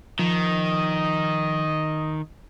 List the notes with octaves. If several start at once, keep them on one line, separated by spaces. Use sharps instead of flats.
D#3 F3 D#5